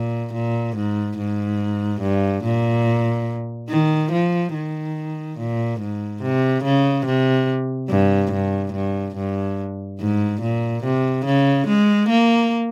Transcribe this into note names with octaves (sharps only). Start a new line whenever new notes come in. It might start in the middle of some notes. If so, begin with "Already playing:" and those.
Already playing: A#2
A#2
G#2
G#2
G2
A#2
D#3
F3
D#3
A#2
G#2
C3
C#3
C3
G2
G2
G2
G2
G#2
A#2
C3
C#3
G#3
A#3